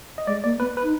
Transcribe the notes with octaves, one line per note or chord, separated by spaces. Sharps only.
D#5
G#3 D5
A#3 D5
B3 B4
B4
D#4